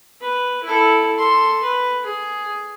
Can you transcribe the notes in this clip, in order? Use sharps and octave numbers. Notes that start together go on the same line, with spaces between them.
B4
E4 A4
A4 C6
B4
G#4